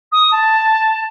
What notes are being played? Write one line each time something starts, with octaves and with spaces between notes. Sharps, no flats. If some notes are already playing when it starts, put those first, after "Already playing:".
D#6
A5